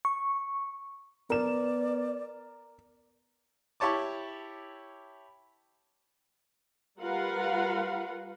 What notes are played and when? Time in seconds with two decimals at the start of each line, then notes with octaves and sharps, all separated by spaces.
0.05 C#6
1.30 B3 A#4 D5 E7
3.80 E4 G4 C#5 A5 D6
6.99 G3 F4 A#4 B4 F5 F#5